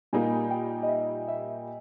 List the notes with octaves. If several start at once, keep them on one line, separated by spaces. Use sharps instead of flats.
A#2 G3 A#3 D#4 G#5
G5
D#5
E5
E5